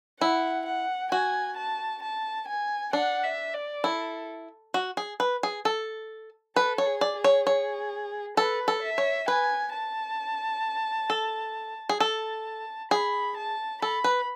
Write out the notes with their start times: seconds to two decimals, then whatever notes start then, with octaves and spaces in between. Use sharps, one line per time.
0.21 E4 F#5
0.66 F#5
1.12 F#4 G#5
1.57 A5
2.02 A5
2.48 G#5
2.93 D4 F#5
3.24 E5
3.54 D5
3.84 E4 A4
4.74 F#4
4.97 G#4
5.20 B4
5.43 G#4
5.65 A4
6.56 A4 B4
6.78 C#5
6.86 G#4
7.01 D5
7.17 G#4
7.24 C#5
7.47 C#5
8.37 A4 B4
8.68 A4
8.83 E5
8.98 C#5
9.28 B4 G#5
9.74 A5
11.10 A4
11.89 G#4
12.00 A4 A5
12.91 G#4 B5
13.37 A5
13.82 A4 B5
14.04 B4